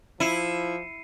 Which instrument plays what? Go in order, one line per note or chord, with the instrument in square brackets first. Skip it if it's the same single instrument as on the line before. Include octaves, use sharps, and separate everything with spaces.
[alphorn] F3 [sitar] E4 [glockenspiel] C7 C#7 D#7